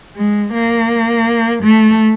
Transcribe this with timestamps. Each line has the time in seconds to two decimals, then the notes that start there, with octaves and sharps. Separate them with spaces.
0.16 G#3
0.53 A#3
1.63 A3